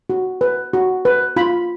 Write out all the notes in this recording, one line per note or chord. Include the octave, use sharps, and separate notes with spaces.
F#4
B4
F#4
B4
F4 B5